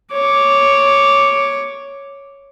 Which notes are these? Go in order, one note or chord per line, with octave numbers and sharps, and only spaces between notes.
C#5 D6